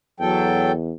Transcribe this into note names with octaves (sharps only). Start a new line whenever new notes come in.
E2 F#3 A4 G5